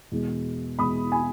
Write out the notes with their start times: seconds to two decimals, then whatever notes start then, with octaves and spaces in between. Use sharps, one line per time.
0.11 E2 B2 G#3
0.79 E2 B2 G#3 B5 D#6
1.12 G#5 B5